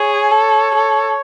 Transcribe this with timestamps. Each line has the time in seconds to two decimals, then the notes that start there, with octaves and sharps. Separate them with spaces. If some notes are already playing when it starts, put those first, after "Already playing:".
Already playing: G#4 C#5
0.31 A4
0.75 A4